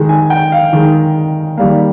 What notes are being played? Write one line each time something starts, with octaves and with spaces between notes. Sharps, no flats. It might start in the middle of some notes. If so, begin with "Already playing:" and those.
Already playing: D#3 G#3
G#5
G5
F5
D#3 G#3
D#3 G3 A#3 F5